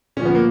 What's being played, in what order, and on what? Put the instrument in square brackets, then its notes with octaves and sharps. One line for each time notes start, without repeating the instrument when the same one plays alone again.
[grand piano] A#2 F3 C#4
B3
A#3